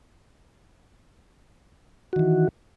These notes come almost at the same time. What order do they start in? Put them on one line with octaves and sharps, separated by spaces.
F#4 D#3 E3